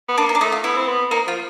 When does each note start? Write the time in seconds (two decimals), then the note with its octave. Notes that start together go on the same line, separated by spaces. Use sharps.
0.09 B3
0.18 A#3 D4
0.29 D#4
0.35 D4
0.41 A3 D#4
0.52 F4
0.64 B3 E4
0.76 C4
0.88 B3
1.11 A#3 D#4
1.27 F3 F4